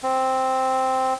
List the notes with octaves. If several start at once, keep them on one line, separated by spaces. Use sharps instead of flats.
C4